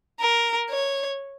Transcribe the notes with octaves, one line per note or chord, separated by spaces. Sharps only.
A#4
C#5